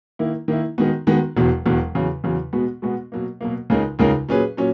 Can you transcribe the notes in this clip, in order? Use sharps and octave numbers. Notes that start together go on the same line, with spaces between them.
D#3 A#3 E4
D#3 A#3 E4
D#3 G#3 B3 F#4
D#3 G#3 B3 F#4
E1 E2 B2 F#3
E1 E2 B2 F#3
E2 C#3 F#3
E2 C#3 F#3
B2 G#3 B3 F#4
B2 G#3 B3 F#4
B2 F#3 A#3
B2 F#3 A#3
C#2 C#3 G#3 D#4 A#4
C#2 C#3 G#3 D#4 A#4
A#2 F#3 C#4 G#4 B4
A#2 F#3 C#4